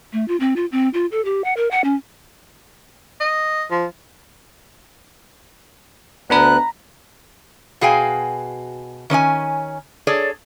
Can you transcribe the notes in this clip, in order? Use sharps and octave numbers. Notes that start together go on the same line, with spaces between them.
A3
F4
C4
F4
C4
F4
A4
G4
F#5
A#4
F#5
C#4
D#5
F3
D2 B3 D4 B4 A#5 B5 F#6
B2 F#4 G#4 F5 G5 G#5
D#3 C#4 D5 G#5
G#4 A4 C#5 D5